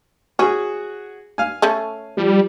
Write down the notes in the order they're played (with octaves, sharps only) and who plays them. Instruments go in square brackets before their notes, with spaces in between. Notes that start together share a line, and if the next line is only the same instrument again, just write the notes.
[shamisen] C#4 [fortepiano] F#4 G#4
[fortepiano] F5 G#5
[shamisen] A3 C#4 A4
[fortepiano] F3 [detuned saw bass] G3